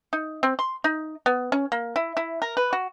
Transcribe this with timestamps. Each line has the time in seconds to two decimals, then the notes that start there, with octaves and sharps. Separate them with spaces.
0.13 D#4
0.43 C4
0.59 C6
0.84 D#4
1.26 B3
1.52 C#4
1.72 A#3
1.96 E4
2.17 E4
2.42 A#4
2.57 B4
2.73 F#4